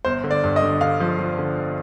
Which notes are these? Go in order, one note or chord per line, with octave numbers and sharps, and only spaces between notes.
G1 C5
D3
D5
G2
D#5
D3
D3 F5
F3
F3
D3